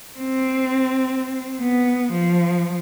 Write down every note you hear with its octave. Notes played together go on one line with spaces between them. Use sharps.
C4
B3
F3